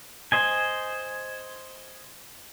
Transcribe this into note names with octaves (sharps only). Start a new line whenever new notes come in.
C5 D#5 G#5